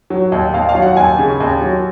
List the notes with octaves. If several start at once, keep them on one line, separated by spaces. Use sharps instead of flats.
F#3
D#2
D#2 F5
F5
F#3
F#5
D#2 G#5
C#3
D#2
F#3